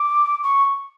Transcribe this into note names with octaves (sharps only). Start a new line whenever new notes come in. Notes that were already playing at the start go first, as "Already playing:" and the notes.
Already playing: D6
C#6